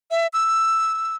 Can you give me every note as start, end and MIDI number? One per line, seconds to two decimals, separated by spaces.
0.11 0.27 76
0.33 1.16 88